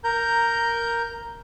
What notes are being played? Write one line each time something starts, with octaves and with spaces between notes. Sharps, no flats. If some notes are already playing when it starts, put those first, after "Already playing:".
A#4 A#5 G6